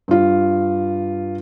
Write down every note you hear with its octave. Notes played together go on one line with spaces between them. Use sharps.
G2 F4